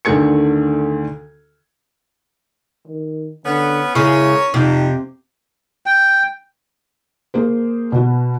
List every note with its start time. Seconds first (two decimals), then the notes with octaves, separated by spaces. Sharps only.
0.05 D2 D3 D#3 A3 G#6 C#7
2.88 D#3
3.45 D3 B3 C#4
3.95 C#3 G#3 C#4 E4 A#4 C#5
4.54 F2 C3 D#4
5.86 G5
7.34 A#3 G#4 C5
7.92 B2 F#4